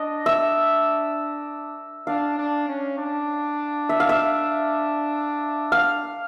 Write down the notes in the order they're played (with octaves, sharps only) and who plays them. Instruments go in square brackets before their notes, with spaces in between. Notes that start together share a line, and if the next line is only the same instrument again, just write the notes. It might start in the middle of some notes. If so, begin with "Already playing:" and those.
Already playing: [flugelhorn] D4 [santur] D#5
[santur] E5
[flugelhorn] D4 [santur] F5
[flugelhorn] D4
C#4
D4
[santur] E5
F5
E5
F5